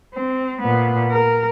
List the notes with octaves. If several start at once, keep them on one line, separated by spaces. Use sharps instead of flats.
C4
A#2 B3
A#4